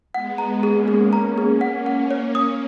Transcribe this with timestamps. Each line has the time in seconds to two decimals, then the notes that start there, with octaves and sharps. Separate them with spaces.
0.14 G#3 B3 F#5
0.38 A#5
0.63 A#3 C#4 G#4
0.88 G#4
1.12 A#3 C#4 A#5
1.38 G#4
1.61 F#5
1.86 F#5
2.11 C#5
2.35 D#6